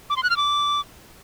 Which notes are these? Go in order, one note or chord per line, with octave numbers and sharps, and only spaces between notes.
D6
C6
F#6
F6
D6